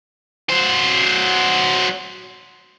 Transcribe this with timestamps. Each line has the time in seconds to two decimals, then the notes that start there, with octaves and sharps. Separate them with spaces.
0.49 F#3 C5